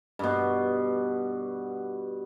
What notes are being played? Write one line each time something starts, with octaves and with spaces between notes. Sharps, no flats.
G2 B2